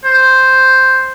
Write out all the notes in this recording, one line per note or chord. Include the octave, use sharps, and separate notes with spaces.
C5